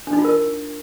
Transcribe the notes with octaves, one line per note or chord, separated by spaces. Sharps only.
D4
D#4
F4
A#4